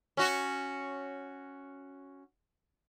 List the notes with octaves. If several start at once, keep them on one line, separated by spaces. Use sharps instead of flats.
C#4 F#4